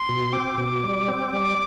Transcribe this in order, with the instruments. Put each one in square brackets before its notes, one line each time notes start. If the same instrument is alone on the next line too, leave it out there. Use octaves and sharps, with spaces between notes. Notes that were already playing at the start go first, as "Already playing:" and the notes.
Already playing: [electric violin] C6
[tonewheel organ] B2
[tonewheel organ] C4 [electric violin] D6
[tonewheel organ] B2
G3
C4
[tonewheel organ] G3 [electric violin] D6